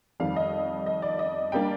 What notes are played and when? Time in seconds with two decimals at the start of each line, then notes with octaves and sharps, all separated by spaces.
0.20 F2 D#3 G3 F5
0.36 D#5
0.86 D#5
1.02 D5
1.19 D#5
1.52 G3 A#3 D4 G5